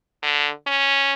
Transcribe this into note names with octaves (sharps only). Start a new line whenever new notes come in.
D3
C#4